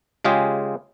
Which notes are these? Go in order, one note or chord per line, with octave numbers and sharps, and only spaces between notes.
C#3 G#3 F4 G4 G#4